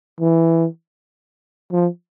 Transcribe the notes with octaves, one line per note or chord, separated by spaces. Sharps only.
E3
F3